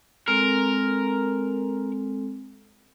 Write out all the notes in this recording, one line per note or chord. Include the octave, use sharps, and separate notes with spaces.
G#3 C4 A4 A#4